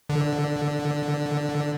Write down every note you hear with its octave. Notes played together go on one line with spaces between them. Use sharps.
D3